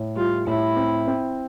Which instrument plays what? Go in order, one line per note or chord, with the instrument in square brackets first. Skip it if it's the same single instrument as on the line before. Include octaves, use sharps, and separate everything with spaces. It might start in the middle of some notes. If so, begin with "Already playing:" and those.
Already playing: [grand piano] A2
[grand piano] G3 [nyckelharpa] F4
[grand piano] A2 [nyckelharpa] E4
[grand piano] C4
C4